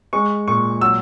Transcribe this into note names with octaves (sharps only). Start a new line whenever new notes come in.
G#3 C#6
A#2 C#6
F#3 E6